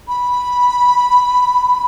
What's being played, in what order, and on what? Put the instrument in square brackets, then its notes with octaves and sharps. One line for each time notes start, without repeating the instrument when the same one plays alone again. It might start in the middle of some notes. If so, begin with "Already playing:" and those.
[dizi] B5